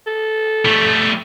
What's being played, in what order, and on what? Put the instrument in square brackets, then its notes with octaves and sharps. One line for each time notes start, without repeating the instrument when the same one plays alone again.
[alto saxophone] A4
[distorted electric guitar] G3 A3